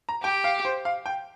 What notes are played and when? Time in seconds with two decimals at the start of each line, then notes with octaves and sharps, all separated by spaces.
0.09 A#5
0.23 G4 G5
0.44 F5
0.65 C5
0.85 F5
1.06 G5